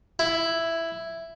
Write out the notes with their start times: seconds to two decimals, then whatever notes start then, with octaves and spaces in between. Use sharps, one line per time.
0.19 E4